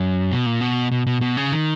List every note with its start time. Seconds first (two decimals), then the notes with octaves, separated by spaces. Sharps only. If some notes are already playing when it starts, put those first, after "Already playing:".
Already playing: F#2
0.32 B2
0.46 A#2
0.61 B2
0.92 B2
1.07 B2
1.21 B2
1.37 C#3
1.52 D#3